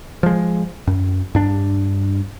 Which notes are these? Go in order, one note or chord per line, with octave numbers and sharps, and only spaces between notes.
F3 G#3
F#2
G2 D4